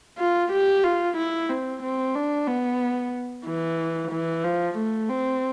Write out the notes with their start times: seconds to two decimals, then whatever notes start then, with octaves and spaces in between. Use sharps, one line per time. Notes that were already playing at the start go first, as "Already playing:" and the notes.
0.18 F4
0.52 G4
0.84 F4
1.17 E4
1.50 C4
1.83 C4
2.15 D4
2.47 B3
3.46 E3
4.11 E3
4.44 F3
4.77 A3
5.09 C4